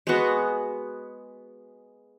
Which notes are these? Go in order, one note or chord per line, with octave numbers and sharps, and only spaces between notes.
G#3 B3 F#4